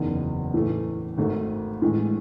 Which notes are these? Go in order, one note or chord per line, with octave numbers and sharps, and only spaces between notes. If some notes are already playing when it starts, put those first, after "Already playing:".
Already playing: F#1 E2 D#3
A2 E3 A3
G#1 G#2 D#3 A3
A2 E3 G#3